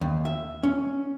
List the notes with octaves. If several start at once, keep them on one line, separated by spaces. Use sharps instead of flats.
D#2
E5
C#4